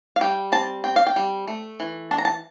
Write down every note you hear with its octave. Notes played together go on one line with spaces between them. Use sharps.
F5
G3 G5
C4 A5
C4 G5
F5
G5
G3
A3
E3
D4 A5
A#5
A5